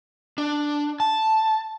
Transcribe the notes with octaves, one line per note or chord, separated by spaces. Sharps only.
D4
A5